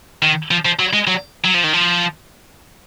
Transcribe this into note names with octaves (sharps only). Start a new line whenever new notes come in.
D#3
F3
F3
F#3
G#3
F#3
F#3
F3
D#3
F3